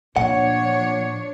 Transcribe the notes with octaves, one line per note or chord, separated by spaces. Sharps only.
A#2 F3 D4 C#5 F#5